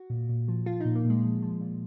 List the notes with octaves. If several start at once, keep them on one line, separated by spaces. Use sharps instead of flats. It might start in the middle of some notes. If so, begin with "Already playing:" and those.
Already playing: F#4
A#2
A#2
F3
F3 F4
A#2 D#4
A#3
A#2
G#3
F3
F3
A#2